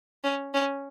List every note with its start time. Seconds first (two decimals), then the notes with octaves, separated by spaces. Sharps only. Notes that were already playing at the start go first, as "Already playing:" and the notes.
0.24 C#4
0.54 C#4